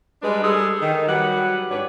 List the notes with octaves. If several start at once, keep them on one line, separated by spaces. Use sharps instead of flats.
G3 G#3 D4 B4
G3 G#4 A4
D#3
F#3 G3 G4 B4 F#5
G#2 D4 G4 B4 C#5